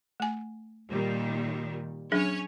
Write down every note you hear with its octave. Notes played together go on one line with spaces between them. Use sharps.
A3 G#5
A#2 D#3 G3
F#3 C#4 D4 G#4 C#5